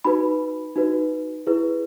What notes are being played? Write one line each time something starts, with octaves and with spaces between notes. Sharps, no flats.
D#4 F#4 B4 B5
D#4 F#4 B4
E4 G#4 B4